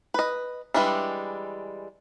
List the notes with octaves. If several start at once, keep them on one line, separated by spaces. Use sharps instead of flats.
B4 D#5
E3 G3 G#3 D4 E4